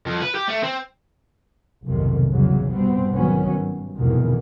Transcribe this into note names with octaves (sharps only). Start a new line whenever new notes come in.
F2
B4
G4
A3
C4
F1 B1 F2 G#2 C3 D#3
E2 G2 C#3 F#3
G2 B2 G3 B3 C4
G#1 G2 D#3 F#3 B3 C#4
G2
F1 E2 G2 B2 D#3